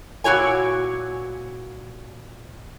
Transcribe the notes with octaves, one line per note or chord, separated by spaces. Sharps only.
A#2 E4 F#4 C#5 G#5